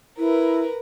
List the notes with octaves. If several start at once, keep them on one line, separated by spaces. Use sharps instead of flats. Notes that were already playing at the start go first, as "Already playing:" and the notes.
E4 A#4 B4